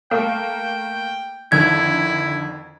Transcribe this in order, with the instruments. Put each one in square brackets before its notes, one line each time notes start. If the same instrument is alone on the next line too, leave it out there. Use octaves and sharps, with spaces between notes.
[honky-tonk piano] A3 A#3 [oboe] G5
[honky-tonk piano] F2 D3 D#3 [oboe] E4 [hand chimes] G#6